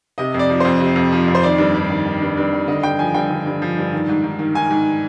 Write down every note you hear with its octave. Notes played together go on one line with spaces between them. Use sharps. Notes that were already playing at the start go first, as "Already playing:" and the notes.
C3 D#5
F2
D5
F3
F2 C5
C3
F2
F3
F2
C5
D#3 D5
G2
G2
D#3
D#3
G2
G2
D#3
D3 D#5
G2 G5
F3 G#5
G2 G5
D3
G2
F3
G2
D#3
G#2
G#2
D#3
D#3 G#5
G#2